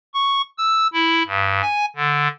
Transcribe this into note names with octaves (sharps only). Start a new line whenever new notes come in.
C#6
E6
E4
G2
G#5
D3